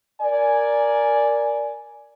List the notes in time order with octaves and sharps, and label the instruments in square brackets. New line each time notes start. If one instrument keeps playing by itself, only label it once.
[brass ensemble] A#4 D5 G#5